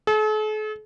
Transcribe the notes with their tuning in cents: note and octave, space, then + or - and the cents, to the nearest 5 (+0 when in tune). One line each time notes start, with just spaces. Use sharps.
A4 -45